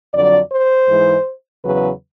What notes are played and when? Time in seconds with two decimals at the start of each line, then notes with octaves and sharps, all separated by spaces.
0.13 F2 D3 F#3 D5
0.52 C5
0.89 G#2 E3 G#3
1.64 E2 C#3 F#3 B4